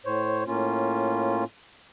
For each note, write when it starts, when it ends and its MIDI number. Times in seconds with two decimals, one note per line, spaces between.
0.06 0.44 45
0.06 0.44 72
0.06 0.44 73
0.47 1.44 45
0.47 1.44 58
0.47 1.44 61
0.47 1.44 65